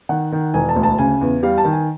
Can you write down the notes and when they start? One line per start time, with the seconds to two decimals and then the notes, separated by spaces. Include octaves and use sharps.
0.09 D#3 F#5
0.32 D#3
0.54 E1 G#5
0.69 A5
0.76 D2
0.83 A5
0.98 C#3 G#5
1.21 E2
1.43 G3 F5
1.58 A5
1.64 D#3
1.72 G#5